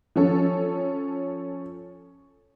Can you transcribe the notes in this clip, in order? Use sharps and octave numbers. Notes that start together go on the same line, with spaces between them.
F3 C#4 A4